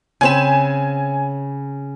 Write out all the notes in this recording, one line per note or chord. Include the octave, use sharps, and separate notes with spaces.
C#3 C4 G#5 B5 E7